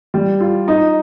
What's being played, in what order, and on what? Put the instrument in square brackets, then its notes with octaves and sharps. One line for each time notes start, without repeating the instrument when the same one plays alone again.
[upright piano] G3
F4
D#4